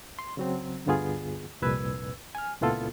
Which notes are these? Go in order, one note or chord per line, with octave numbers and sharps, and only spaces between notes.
C6
C#3 F#3 C4
D2 G2 D3 B3 F4 G#4
C2 F2 A#2 B4 E6 G#6
G#5 F6
C#2 A#2 B3 E4 F4 A4